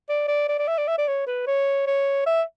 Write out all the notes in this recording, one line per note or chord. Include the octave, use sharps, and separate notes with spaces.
D5
D5
D5
D5
E5
D5
E5
D5
C#5
B4
C#5
C#5
E5